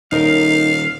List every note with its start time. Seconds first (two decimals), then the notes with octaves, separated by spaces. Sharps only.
0.12 D#1 D#4 A#4 F5